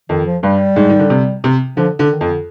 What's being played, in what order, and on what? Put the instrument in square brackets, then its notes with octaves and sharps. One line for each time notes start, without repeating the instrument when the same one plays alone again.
[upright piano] F2 [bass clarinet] D#3
[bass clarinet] F3
[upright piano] G2 [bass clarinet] G3
[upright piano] G#2
D#3
D3
C3
C3
[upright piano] D3 [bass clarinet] F3
[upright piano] D3
[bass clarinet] D#3
[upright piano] F2
[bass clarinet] D3